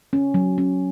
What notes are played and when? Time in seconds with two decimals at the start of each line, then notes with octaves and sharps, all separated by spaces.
0.13 C#4
0.34 F#3
0.58 C#4